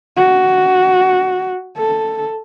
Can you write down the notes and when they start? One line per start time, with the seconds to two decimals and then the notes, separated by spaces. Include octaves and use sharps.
0.17 F#4
1.78 A4